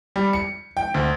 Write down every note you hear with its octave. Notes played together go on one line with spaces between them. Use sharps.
G3
C#7
G5
D2